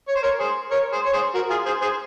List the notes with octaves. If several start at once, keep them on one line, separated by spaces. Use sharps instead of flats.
C#5
C5
A#4 C#5
G#4 C5
A#4 C#5
G#4 C5
C#5
G#4 C5
F#4 A#4
F4 G#4
G#4 C5
G#4 C5